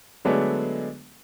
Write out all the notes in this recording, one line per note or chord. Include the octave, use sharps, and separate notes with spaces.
D3 F#3 G#3 A3 B3 D4